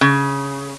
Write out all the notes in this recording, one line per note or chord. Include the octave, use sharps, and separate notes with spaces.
C#3